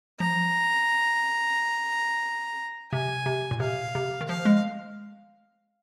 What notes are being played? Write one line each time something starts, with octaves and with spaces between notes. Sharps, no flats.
F3 A#5
C3 G#5
C3
A#2
C3 F5
C3
D#3
F3 F5
G#3